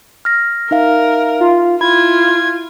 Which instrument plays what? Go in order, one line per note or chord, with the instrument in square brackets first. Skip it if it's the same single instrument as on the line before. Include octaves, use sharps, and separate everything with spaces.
[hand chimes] F6 A#6
[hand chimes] D#4 E5 F5 [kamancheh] A#4
[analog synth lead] F4
[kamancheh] E4 F4 [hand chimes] B5 [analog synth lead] G#6